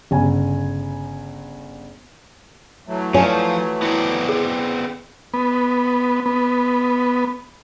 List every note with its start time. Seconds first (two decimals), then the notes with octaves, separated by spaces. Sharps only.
0.11 G1 C#3 G#5
2.87 E3 F#3 A3
3.14 F3 C#5 G#5
3.82 B3 C4 E4 D5
4.28 G#4
5.34 B3
6.26 B3